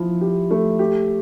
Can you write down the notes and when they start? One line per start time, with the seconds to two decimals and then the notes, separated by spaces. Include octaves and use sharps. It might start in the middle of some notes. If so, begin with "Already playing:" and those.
Already playing: F3 E4
0.21 G4
0.51 A3
0.79 G4